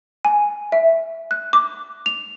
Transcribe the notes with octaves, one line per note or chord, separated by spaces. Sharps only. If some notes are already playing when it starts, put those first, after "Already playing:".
G#5
E5
F#6
D6
F7